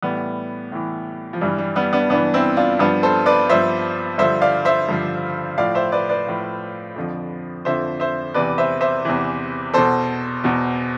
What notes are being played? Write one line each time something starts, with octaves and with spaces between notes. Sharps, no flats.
A2 E3 G3 B3
A2 E3
F3
G2 E3 G3
G3
G3 B3
B3 D4
G2 E3 B3 D4
C4 E4
D4 F4
G2 F3 B3 D4
A4 C5
B4 D5
G2 F3 C5 E5
G2 D3 F3 C5 E5
D5 F5
C5 E5
G2 D3 F3
A2 F3 D5 F5
C5 E5
B4 D5
B4 D5
A2 F3
F2 D3 F3
F2 D3 F3 C5 E5
C5 E5
E2 C3 E3 B4 D5
C5 E5
C5 E5
E2 C3 E3
E2 B2 A4 C5
E2 B2